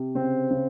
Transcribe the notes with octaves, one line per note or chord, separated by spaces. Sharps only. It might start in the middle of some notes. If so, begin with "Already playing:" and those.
Already playing: C3
C#3 C4 C5
C#3